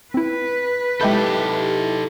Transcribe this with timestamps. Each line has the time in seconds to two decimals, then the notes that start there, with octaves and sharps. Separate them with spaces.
0.14 C4 E4 B4
1.01 G#3 D#4 E4 G4 A4 E5 G6